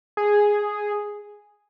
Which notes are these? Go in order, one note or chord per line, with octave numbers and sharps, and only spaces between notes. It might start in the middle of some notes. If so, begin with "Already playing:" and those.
G#4